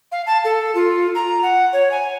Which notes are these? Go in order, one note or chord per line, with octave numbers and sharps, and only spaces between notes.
F5
A5
A4
F4
A#5
F#5
C#5
G#5